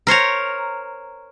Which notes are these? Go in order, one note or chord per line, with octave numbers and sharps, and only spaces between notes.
A#4 C5 C#5 A#5